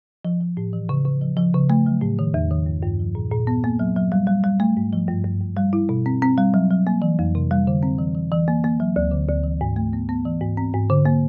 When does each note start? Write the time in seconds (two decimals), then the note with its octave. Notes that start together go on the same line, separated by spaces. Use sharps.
0.25 F3
0.41 F3
0.57 A2
0.73 E3
0.89 C#3
1.05 C#3
1.21 F3
1.37 F3
1.54 C#3
1.70 A3
1.86 F#3
2.01 A2
2.19 D#3
2.34 E2
2.51 D#3
2.66 G2
2.83 G2
2.99 F3
3.15 A#2
3.32 A#2
3.47 B3
3.64 A#3
3.79 F#3
3.96 F#3
4.12 G3
4.27 G3
4.44 G3
4.60 A3
4.77 G#2
4.93 F3
5.08 G2
5.24 G2
5.41 G2
5.57 G3
5.73 E4
5.89 B2
6.06 C4
6.22 C4
6.38 G3
6.54 F#3
6.71 F#3
6.87 A#3
7.02 E3
7.19 F2
7.35 C3
7.51 G3
7.67 D3
7.83 C4
7.99 E3
8.15 E3
8.32 E3
8.48 A#3
8.64 A#3
8.80 F#3
8.96 D2
9.11 D3
9.28 D2
9.44 E3
9.61 G#2
9.76 A3
9.93 B3
10.09 B3
10.25 E3
10.41 G#2
10.57 C4
10.73 G#2
10.90 D3
11.06 A#3